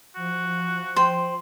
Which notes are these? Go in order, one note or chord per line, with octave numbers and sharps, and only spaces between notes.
F3 F#4
C5 G5 C6